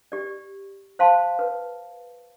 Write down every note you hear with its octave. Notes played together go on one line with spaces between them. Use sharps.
G4 D5
C5 F5 A5 C6
B4